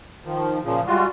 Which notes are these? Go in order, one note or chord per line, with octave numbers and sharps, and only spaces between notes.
D#3 F3
A#2 C#3 F3
G3 G#3 F4 F#4